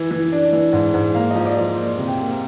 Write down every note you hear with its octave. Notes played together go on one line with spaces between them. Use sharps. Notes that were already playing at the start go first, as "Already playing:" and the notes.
Already playing: E3
E3
D4
E3
G#2
G#2
A#3 F5
F3 D#5
D5
F3
A#3 D5
C3
G5
A#3